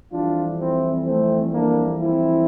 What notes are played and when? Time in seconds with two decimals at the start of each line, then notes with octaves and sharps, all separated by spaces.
0.11 F2 E3 G3 D4 F4
0.58 C4 E4
1.05 A3 C4
1.53 A#3 D4
1.99 C4 E4